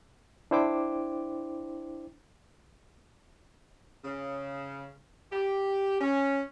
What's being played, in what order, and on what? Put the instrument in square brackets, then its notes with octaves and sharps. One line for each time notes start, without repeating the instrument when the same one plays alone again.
[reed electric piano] D4 E4 C5 G5 D6
[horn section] C#3
G4
C#4